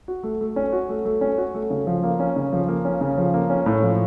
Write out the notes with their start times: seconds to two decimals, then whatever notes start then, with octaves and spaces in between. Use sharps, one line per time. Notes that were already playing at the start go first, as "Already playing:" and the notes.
0.08 F#4
0.23 A3
0.41 A3
0.56 C#4
0.73 F#4
0.89 A3
1.05 A3
1.21 C#4
1.38 F#4
1.54 A3
1.70 C#3
1.87 F3
2.03 A#3
2.20 C#4
2.36 C#3
2.53 F3
2.68 A#3
2.85 C#4
3.01 C#3
3.18 F3
3.34 A#3
3.50 C#4
3.66 A2
3.83 F3